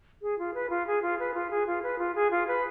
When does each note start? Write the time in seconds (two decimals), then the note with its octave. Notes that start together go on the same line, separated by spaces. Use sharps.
0.22 G#4
0.39 F4
0.54 B4
0.70 F4
0.87 G#4
1.02 F4
1.19 B4
1.34 F4
1.50 G#4
1.67 F4
1.83 B4
1.98 F4
2.15 G#4
2.31 F4
2.48 B4